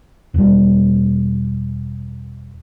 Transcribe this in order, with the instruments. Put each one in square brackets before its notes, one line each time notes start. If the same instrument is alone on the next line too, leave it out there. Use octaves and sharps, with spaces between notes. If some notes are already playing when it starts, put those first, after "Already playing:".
[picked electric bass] E1 G3